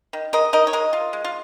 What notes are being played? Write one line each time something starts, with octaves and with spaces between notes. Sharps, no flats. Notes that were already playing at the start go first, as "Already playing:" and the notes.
D#3
G#3 A#4 D#5
D#4 A#4 D#5
C#5
G#3 A#4 D#5
F4
G#3
F4